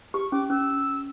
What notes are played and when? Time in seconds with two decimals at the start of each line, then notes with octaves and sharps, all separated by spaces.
0.14 G4 C#6
0.32 C#4 D6
0.50 C#4 E6